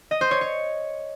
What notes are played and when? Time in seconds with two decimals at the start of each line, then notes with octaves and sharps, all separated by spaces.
0.11 D#5
0.21 C5
0.31 C#5
0.41 C#5